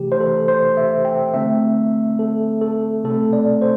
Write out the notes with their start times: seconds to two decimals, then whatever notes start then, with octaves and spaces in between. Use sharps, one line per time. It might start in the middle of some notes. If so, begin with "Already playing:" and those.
Already playing: C3 E3 A3 G4
0.12 C5
0.20 A4
0.48 C5
0.77 E5
1.05 G5
1.34 D3 A3 C4 E5
2.19 A4
2.61 A4
3.04 C3 A3 C4 A4
3.33 D5
3.62 C5